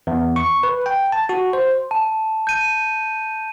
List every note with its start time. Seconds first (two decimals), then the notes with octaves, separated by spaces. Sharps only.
0.07 E2
0.36 C#6
0.63 B4
0.86 G5
1.12 A5
1.29 F#4
1.53 C5
1.91 A5
2.47 G6 D#7